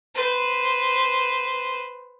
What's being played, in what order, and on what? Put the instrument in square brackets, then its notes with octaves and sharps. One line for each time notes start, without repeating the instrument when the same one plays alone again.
[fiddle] B4 C5